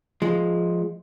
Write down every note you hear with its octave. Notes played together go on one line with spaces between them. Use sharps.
F3 G#3